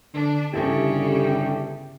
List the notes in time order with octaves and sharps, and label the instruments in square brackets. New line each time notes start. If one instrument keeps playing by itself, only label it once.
[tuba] D3 [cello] D4
[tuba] G1 [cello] C#3 [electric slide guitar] E4 A4 E5 [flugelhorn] G4